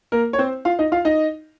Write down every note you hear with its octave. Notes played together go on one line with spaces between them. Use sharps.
A#3 A#4
C#5
C4 C5
F4 F5
D#4 D#5
F4 F5
D#4 D#5